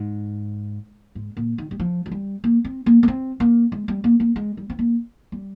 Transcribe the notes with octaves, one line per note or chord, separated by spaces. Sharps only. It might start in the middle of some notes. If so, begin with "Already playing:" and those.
Already playing: G#2
G#2
A#2
D#3
G3
F3
F3
G3
A#3
C4
A#3
A#3
C4
A#3
G#3
G3
A#3
A#3
G#3
G3
C4
A#3
G3